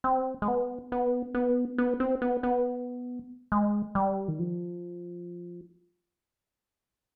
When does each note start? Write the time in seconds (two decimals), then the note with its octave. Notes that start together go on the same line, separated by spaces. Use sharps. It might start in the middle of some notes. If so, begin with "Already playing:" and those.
0.04 C4
0.42 G#3
0.48 B3
0.92 B3
1.35 B3
1.78 B3
2.00 C4
2.22 B3
2.43 B3
3.52 G#3
3.95 G3
4.28 D#3
4.39 F3